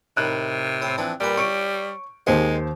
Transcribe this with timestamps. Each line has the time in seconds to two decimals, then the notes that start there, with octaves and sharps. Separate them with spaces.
0.17 A2 C3 D#3 F#6
0.82 A2 C4 C5
0.98 E3 F3 C4 D4
1.20 A#2 G3 B4
1.37 C#5 C#6 D7
2.27 D#2 D#3 G#3 G4 C5